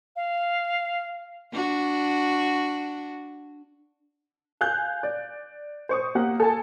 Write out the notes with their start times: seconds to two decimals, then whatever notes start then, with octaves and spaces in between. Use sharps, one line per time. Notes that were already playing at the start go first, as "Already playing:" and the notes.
0.16 F5
1.52 D4 F#4
4.61 F5 G#5 F#6 G6
5.03 D5
5.89 C5 C#6 D#6
6.15 A#3 G4 F#5
6.40 A4 G#5 A5